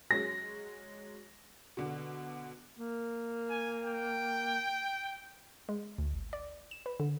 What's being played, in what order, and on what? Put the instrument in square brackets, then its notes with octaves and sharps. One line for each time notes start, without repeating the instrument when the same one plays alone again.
[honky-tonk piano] F#3 G#3 C#4 [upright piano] A#6
[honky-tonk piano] B2 D3
[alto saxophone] A#3
[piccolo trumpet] G#5
G5
[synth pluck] G#3
D2
G#1
D5
E7
B4
D3